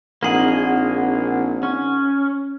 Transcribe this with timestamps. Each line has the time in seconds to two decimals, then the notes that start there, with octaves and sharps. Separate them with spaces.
0.23 A#1 A#3 C4 D#4 G#4 D#5 F#5
1.63 C#4